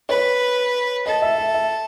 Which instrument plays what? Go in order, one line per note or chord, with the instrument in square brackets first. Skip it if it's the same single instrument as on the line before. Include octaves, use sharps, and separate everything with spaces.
[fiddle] B4 [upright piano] C#5
[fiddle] A4 [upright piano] D#5
[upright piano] E5
E5
E5